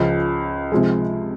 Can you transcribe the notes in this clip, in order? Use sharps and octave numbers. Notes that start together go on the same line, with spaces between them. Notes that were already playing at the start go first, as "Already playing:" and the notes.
Already playing: C#2 C#3 F3
C3 F3 G#3